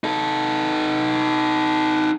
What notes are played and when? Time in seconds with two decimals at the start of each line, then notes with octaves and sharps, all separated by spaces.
0.04 D#4 A4